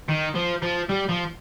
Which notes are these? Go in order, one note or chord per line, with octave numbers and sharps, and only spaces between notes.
D#3
F3
F3
G3
F3